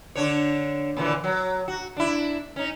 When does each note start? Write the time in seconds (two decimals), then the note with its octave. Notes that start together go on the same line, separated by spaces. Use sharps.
0.15 D3 D4 C#5
0.97 A#2 D3 E3
1.24 F#3
1.68 F#4
1.97 D4 E4
2.56 C#4 D#4